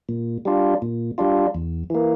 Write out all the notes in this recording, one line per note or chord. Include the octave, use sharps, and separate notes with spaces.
A#2
G3 D4 F4
A#2
G3 D4 F4
E2
E3 A#3